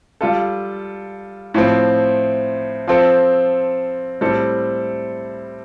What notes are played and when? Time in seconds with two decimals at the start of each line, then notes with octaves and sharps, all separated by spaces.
0.21 G3 F4 A4
1.54 A2 F3 C4
2.88 F3 C4 A4
4.21 A2 G3 C4 A4